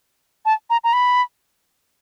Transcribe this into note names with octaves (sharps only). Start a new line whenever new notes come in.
A5
A#5
A#5
B5